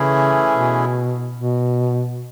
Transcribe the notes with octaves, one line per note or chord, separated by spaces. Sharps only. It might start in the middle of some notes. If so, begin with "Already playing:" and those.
Already playing: C#3 E3 A3 C#4 E4 G#4
B2
B2